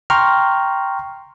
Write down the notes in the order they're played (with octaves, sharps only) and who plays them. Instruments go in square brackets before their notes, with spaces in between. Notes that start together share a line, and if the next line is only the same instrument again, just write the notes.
[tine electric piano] G5 A#5 C6 C#6 F6